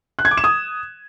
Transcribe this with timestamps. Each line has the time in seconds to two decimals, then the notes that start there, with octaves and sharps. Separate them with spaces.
0.19 F#6
0.25 G#6
0.31 D6
0.37 E7
0.44 D#6